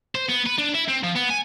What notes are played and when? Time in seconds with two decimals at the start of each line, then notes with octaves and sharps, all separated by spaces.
0.15 C5
0.29 B3
0.46 B4
0.58 D4
0.75 E4
0.88 C4
1.03 F3
1.15 B3
1.30 G#5